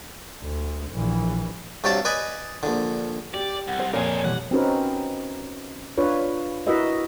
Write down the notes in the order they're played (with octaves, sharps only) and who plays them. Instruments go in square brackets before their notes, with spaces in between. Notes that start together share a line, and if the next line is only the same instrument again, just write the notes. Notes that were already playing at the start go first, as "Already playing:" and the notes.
[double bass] D2
A#1 E3
[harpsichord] G2 C3 F#3 C#5 D5 A5
B4 D5 D#5 G#5 B5
A#1 D3
[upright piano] G4 [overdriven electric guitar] D5
[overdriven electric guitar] C2 [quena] F#5
[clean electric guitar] C5
[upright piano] F2 A#2 [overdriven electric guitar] G#4 A#4 [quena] C#5 [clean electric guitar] F5 G#5
[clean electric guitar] B2 E3 G3 [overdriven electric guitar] F#5
[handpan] C4 C#4 D#4 F#4 A#4 B4
D4 F4 B4 C#5
E4 F#4 A#4 B4 D#5 E5